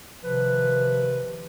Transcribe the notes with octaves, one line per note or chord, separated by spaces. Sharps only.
C3 D#3 F3 B4